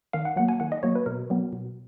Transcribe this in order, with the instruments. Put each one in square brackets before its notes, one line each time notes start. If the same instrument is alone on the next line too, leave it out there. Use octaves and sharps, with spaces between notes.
[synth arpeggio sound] D#3 F5
F#5
F#3 A#3 F#5
G#5
D#3 F#5
D#5
F#3 A#3 C#5
B4
B2 A#4
F#3 B3
B2